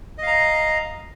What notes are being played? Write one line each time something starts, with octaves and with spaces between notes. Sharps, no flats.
D#5 F5 A#5